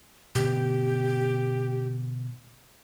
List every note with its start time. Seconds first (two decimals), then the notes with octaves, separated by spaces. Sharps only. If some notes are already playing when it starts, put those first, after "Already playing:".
0.35 B2 D3 B3 G4